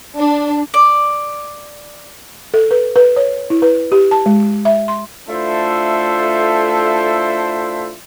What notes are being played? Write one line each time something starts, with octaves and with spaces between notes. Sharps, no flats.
D4
D5
A4
B4
B4
C#5
E4
B4
G4
A5
G#3
E5
C6
A3 D4 E4 F4 A4 C5